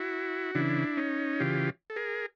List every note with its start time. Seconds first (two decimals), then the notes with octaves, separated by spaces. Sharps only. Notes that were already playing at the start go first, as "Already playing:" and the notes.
Already playing: E4 F#4
0.55 C#3 E3 D4 E4
0.97 C#4 D#4
1.40 C#3 E3 F4 G4
1.90 A4
1.96 G#4 A#4